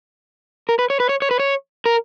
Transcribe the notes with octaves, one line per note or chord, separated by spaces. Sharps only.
A#4
B4
C#5
B4
C#5
C#5
B4
C#5
A#4